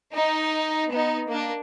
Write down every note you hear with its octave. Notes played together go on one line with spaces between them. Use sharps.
D#4
B3 D#4
A#3 D4